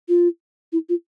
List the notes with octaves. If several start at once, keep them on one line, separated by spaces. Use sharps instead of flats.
F4
E4
F4